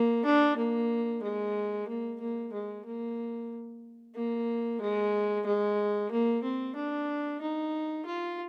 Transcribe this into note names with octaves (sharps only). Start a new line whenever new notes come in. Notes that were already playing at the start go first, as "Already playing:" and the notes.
Already playing: A#3
D4
A#3
G#3
A#3
A#3
G#3
A#3
A#3
G#3
G#3
A#3
C4
D4
D#4
F4